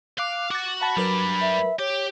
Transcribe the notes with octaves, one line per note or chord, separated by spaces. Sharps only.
F5 D6 F#6
F#4 D6 A6
F#5 A5 B5
F#3 G3 D4 A#4 B4
E5
G4 C#5